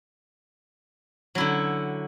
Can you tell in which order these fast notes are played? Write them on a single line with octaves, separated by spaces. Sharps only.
F#3 E4 D3